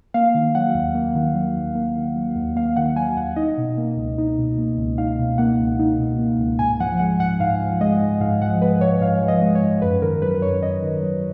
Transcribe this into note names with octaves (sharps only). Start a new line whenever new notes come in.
A#3 F5
D#3
F#3 F#5
D#2
A#3
D#3
F#3
D#2
A#3
D#3
F#3
D#2
A#3 F5
D#3 F#5
F#3 G#5
D#2 F#5
D#4 D#5
B2
A#3
C#2
D#4
B2
A#3
C#2
D#4 F5
B2
A#3 F#5
C#2
D#4
B2
A#3
C#2
G#2 G#5
F3 F#5
G#3 F#5
G#2 F#5
G#2 F5
F3
G#3 D#5
G#2
G#2 F5
F3 F#5
G#3 B4
G#2 C#5
G#2 F5
F3
D#5
G#3
C#5
G#2
F#2 B4
D#3 A#4
F#3 B4
F#2 C#5
F#2 D#5
D#3
F#3